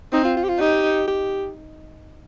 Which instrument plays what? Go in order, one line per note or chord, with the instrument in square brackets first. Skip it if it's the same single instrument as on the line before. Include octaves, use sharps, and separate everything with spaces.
[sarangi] C4 [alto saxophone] D#4
[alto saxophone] F4
F4
G4
F4
[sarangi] D#4 [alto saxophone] G4
[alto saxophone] G4